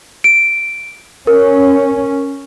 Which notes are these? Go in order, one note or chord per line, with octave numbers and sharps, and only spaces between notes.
D7
C#4 A#4